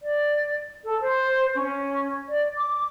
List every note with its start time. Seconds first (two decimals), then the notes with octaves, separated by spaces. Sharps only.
0.02 D5
0.84 A4
1.01 C5
1.54 C#4
2.29 D5
2.55 D6